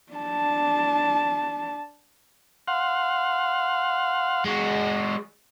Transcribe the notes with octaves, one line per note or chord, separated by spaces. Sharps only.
D4 A5
F5 F#5 C6
G#3 F#4